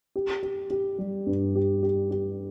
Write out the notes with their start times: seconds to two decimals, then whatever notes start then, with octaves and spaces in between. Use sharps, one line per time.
0.15 G4
0.43 G4
0.70 G4
0.98 G3
1.27 G2
1.56 G4
1.83 G4
2.11 G4